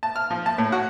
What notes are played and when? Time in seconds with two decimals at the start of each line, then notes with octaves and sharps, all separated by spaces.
0.03 A5
0.16 F6
0.31 F3
0.46 A5
0.58 A2
0.72 F#4